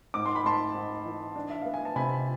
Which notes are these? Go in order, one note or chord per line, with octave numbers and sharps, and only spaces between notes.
G#2 D6
C6
B5
G#2 A5 C6
G#2
E3
D4
E5
B3 F5
G#5
A5
C3 G#5 B5